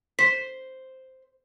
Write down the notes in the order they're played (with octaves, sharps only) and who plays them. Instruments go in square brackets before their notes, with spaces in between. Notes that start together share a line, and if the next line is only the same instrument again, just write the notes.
[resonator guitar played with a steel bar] C5 [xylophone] B6